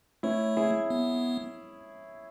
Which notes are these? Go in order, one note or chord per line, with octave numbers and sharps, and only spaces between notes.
A3 C#4 E4
E4 G#4
B3